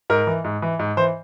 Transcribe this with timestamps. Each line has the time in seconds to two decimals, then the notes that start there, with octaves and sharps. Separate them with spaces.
0.10 G#2 A#4
0.27 E3
0.44 G#2
0.62 E3
0.79 G#2
0.97 E3 C5